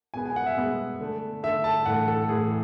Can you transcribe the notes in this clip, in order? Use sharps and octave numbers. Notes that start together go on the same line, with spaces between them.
B2 G#3 B3 G#5
G#5
F#5
E5
B2 G#3 B3
D3 A3
D3 A3 E5
A5
A2 E3 A3 F#5
A4
A2 E3 A3 G#4